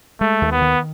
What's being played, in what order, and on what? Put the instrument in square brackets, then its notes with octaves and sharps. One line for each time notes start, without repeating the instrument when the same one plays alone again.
[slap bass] G#3 [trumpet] A3
[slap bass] D#2
[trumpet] B3
[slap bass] D#3